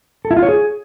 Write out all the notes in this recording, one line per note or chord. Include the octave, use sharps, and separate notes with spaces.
A4
E4
F4
C#5
G#4